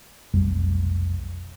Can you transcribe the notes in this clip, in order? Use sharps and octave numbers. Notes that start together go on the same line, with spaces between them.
F1 B1 F2 G3